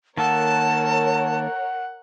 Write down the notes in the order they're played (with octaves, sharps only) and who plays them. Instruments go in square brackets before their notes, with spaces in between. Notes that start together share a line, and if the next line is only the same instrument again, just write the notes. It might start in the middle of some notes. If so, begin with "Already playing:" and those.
[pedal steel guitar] D#3 A#3 A4 [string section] A#4 C#5 [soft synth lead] F#5 [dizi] A5